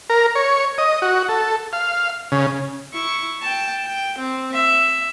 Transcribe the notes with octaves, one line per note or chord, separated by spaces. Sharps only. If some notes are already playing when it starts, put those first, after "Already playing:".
A#4
C#5
D#5
F#4
A4
F5
C#3
E4 C#6
G5 A5
G5
C4
E5